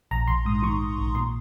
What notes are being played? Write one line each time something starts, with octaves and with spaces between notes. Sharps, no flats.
A#1 A#5
A#1 C6
G#2 D#6
D#3 C#6
G#2
A#1
A#2 C6